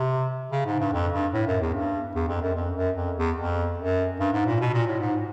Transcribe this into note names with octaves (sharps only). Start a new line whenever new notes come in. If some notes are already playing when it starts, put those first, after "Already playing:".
Already playing: C3
C#3
G#2
G2
F2
G2
A2
F#2
E2
G2
E2
F2
F#2
F2
F#2
F2
E2
F2
F#2
G2
G#2
A#2
B2
A#2
A2
G#2